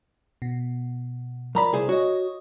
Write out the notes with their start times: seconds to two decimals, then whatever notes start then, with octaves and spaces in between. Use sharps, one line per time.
0.42 B2
1.55 F2 A#4 D5 A#5 B5
1.73 C2 G#4 C5
1.89 F#4 C#5 D#5